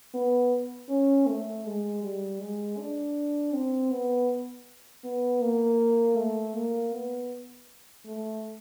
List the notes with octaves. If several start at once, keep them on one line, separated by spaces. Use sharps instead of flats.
B3
C#4
A3
G#3
G3
G#3
D4
C4
B3
B3
A#3
A3
A#3
B3
A3